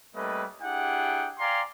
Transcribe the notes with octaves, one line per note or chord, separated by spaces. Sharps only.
G3 A3 A#3 C#4 B4 D#5
D4 E4 G4 G#4 F#5 G5
D5 F5 G5 G#5 A#5 C6